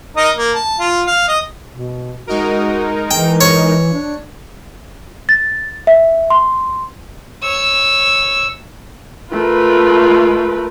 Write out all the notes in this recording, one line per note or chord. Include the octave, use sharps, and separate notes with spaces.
D#4 A#4 D#5
A#3
A5
F4
F5
D#5
B2
G#3 D#4 F#4 A#4
E3 G5
C#5
D4
A6
E5
C6
C#5 E6
A3 F4 A#4 B4